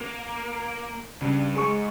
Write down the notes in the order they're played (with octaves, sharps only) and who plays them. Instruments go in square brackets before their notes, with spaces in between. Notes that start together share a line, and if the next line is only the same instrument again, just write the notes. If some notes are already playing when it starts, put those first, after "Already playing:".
[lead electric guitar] A#3
[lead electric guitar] G2 G3 [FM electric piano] C#3
[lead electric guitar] F2 G#2 [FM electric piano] G#4 C#6